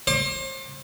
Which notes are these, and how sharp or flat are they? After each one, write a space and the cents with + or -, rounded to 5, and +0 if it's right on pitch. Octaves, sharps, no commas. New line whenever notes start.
C5 +40 D6 +25